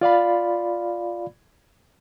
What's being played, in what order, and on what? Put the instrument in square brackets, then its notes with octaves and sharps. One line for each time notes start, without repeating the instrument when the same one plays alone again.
[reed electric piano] F4 D5 F5 B5